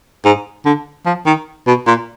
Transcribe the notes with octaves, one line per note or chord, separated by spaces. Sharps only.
G#2
D3
F3
D#3
B2
A#2